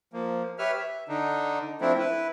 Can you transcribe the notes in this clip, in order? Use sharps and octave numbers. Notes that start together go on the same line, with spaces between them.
F3 A#3
G4 B4 C#5 E5 F6
E5
D3 D4 D#4
F3 A3 C4 D4 E4
E4 B4